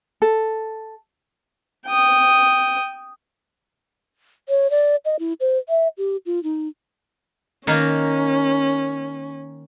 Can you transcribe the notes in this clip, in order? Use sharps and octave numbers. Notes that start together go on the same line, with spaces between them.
A4
G5 D#6
C#5
D5
D#5
E4
C5
E5
G4
F4
D#4
D#3 A#3 C#4